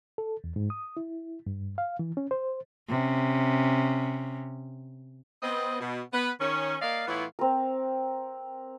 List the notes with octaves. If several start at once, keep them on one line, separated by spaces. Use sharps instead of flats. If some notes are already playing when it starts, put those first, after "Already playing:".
A4
E2
G#2
D#6
E4
G2
F5
E3
C#4
C5
C3 C#4
B3 C4 D#5
B2
B3 B4
D#3 C#4
A#3 D5 D#5 F5
A2 E3 B3 E4 F4 C#5
C4 A#4